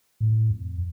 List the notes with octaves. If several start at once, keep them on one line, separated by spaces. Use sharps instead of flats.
A2
F2